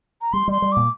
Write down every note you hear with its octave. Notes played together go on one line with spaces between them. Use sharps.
A#5
G3 C6
G3 C6
G3
A#2 D6